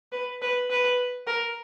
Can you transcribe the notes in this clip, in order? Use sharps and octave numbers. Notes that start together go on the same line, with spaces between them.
B4
B4
B4
A#4